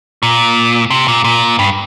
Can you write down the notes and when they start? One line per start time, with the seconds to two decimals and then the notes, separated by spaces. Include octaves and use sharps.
0.23 A#2
0.90 C3
1.08 A#2
1.24 A#2
1.59 G2